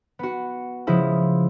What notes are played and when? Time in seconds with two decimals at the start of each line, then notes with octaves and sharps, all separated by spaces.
0.19 B3 F#4
0.87 C#3 F3 G#3 E4